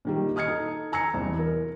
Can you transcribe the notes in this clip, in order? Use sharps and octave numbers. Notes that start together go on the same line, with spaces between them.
A#2 D#3 G3
D#5 D#6 F6 G#6 C#7
D#4 A4
G#5 A#5 E6 G#6 C#7
E1 C2
A#4